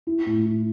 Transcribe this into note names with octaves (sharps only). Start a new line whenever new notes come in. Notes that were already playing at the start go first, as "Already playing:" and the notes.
E4
A2
E4